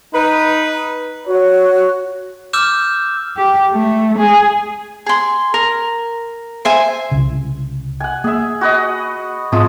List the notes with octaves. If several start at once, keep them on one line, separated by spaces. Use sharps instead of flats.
D#4 B4
F#4 C#5
D6 E6 F6 G6 E7
G4
A3
G#4
G#4 C6
A#4
C5 E5 G#5
C2 C#3
F#5 G#5
A#3 G#4 E5
F#4 B4 D#5
G#2 F3 G#3 C4 D#6